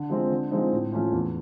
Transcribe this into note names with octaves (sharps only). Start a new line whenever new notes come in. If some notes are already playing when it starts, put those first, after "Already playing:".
Already playing: D3
F3 G#3 C4
D3
F3 G#3 C4 D#4
A2
F3 A3 C#4 F4
E2